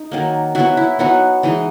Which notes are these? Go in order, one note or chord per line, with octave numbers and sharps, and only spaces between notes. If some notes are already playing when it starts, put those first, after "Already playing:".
Already playing: D#4
D#3 F#3 A#3
F#3 B3 E4 F#4
E4
F#3 B3 D#4 F#4
E3 G#3 D#4